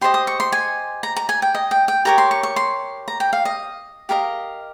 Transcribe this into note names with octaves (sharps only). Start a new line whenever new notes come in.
G4 C5 D#5 C6
D#6
C#6
C6
G#5
A#5
A#5
G#5
G5
D#5
G5
G5
G4 A#4 C#5 A#5
C6
C#6
C#6
C6
A#5
G5
F5
D#5
G4 A#4 D#5 F5